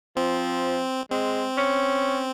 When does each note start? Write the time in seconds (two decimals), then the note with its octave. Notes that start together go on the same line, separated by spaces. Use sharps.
0.16 F3 C4
1.11 G#3 C4
1.57 C#4